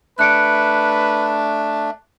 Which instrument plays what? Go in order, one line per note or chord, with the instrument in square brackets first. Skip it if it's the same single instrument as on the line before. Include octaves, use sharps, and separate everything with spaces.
[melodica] A3 D4 [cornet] B4 [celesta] F#6 C#7 D7